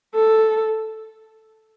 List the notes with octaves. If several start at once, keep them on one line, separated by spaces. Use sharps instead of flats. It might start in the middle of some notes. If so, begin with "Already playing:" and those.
A4